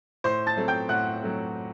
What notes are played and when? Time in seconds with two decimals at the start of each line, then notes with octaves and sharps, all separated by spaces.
0.24 A2 C5 C6
0.47 A5 A6
0.57 F#3 A3 C4
0.68 G5 G6
0.89 A2 F#5 F#6
1.22 F#3 A3 C4